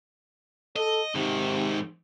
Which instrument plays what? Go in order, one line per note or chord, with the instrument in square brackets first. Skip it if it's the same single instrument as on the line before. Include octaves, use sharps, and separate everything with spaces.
[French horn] A4 [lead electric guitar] D#5
[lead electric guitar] G#2 D#3 [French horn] C3